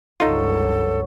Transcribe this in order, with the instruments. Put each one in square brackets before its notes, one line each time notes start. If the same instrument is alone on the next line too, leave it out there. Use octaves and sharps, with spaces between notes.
[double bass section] F1 C#2 G2 [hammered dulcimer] F#3 [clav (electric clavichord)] D#4 F4 [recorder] A4